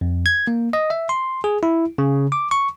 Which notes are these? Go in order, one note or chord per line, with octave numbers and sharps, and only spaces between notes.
F2
G#6
A#3
D#5
E5
C6
G#4
E4
C#3
D6
C#6